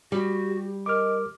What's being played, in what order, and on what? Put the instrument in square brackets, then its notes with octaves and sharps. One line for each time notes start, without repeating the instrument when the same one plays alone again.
[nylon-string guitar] G3 [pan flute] F#4 [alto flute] G4
[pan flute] A#4 [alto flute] D#5 [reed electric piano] D6 F6